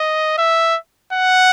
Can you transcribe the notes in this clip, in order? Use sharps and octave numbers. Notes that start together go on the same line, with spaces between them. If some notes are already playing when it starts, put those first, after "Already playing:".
Already playing: D#5
E5
F#5